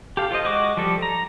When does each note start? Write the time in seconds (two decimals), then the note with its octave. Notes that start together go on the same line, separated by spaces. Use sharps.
0.17 G4 A4 F5
0.31 F4 C5 D5 D#5
0.45 G#3 F#4 D#5 D6
0.77 F3 G3 G4 A4
1.02 A#5